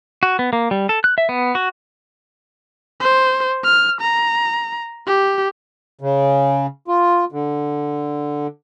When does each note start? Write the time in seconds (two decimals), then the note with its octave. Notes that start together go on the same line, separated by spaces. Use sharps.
0.23 F#4
0.39 B3
0.53 A#3
0.71 G3
0.89 A4
1.04 F#6
1.18 E5
1.29 B3
1.55 F#4
3.00 C5
3.64 F6
4.01 A#5
5.07 G4
6.01 C#3
6.88 F4
7.32 D3